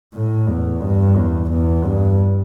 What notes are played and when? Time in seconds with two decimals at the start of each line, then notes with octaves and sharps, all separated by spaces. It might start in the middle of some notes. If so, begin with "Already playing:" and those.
0.15 A2
0.48 E2
0.82 G2
1.16 E2
1.50 E2
1.84 G2